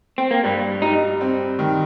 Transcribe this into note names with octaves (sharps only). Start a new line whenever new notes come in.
C4
A#3
G2 G3
G3 D#4
C4
D#3